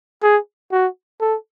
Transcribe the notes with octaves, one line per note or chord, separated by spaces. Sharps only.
G#4
F#4
A4